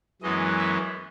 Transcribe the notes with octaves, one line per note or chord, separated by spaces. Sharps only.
F#2 E3 G#3 B3 D#5
E5